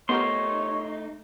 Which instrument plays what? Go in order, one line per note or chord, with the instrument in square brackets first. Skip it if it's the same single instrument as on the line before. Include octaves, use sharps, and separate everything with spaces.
[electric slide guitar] A3 D#4 [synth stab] B3 G4 A#4 [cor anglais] C#5 [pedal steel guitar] C6